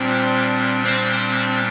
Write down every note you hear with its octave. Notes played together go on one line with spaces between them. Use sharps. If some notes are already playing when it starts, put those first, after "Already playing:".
Already playing: A#2 G3 C4 D4
C4